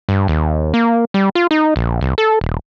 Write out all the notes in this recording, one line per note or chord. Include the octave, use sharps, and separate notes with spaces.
G2
D#2
A#3
G3
F4
D#4
A#1
C2
A4
D#1